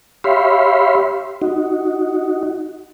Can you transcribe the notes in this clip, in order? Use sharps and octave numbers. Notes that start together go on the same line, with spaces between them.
G4 C#5 E5 F5 B5 C6
D#4 F#4